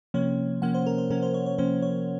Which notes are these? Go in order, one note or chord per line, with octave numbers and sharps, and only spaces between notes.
C3 F3 A#3 C#4 C#5
C3 F3 A#3 C#4 F#5
C5
A#4
C5
C3 F3 A#3 C#4 A#4
C5
C#5
C#5
C3 F3 A#3 C#4 C5
C#5